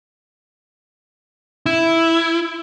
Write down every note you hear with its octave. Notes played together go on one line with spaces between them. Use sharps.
E4